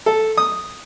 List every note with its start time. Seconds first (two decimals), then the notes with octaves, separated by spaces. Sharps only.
0.06 A4
0.37 D#6